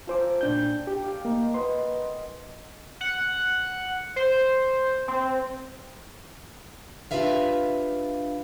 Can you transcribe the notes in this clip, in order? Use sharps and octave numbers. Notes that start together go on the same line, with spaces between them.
F4 A4 C5 G#5 A#5 D6
A#2 D4 G5 G6
G4
D5 F5 G5
A#3 D#4 A#4
F#4 B4 D#5 C6
F#5
C5
C4
D4 F4 G4 B4 E5 F5